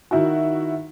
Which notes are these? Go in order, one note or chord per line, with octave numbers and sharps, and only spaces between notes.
D#3 E4 F#4